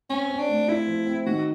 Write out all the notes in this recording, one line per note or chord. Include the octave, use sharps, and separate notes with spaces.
C4 C#4
C4
D4
A3
E4 F4
F3
C4
D#3 F#4